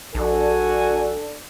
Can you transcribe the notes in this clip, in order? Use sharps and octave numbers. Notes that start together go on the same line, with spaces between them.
A#1 D4 F#4 A4 G#5